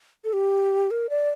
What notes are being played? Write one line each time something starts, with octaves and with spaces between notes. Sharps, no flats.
A4
G4
A#4
D5